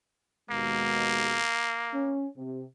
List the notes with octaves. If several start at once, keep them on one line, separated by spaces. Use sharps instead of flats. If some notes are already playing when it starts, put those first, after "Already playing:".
D#2 B2 G#3 A#3
C#4
C3